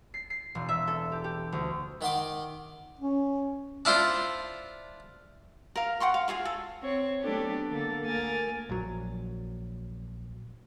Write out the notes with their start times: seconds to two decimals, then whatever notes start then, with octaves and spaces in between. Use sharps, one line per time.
0.14 C7
0.30 C7
0.55 E1
0.69 E5
0.87 A4
1.12 G4
1.24 G4
1.52 D2
2.01 D#3 E5 F#5 C6 D6
2.99 C#4
3.85 D4 E4 F4 C5
5.76 A#4 F5
6.00 F#5 G5 C6 C#6
6.14 F5
6.28 F4 F#4 G#4 F5
6.45 A4
6.81 C4 C#5
7.21 F#3 A3 B3 D4 G4 A4
7.70 D3 A#3 A4
8.05 D2 A#3 A#4 G#5 A6
8.69 A#1 F#3